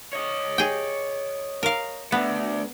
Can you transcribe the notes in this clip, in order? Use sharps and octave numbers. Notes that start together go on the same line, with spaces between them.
C#5 D#5
G#4 G5
A#4 F5
A3 B3 D4